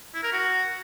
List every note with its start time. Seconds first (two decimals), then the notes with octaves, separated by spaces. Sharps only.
0.14 E4
0.23 A#4
0.32 F#4